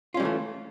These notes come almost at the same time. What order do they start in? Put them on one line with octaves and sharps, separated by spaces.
F4 C#4 G3 E3 A3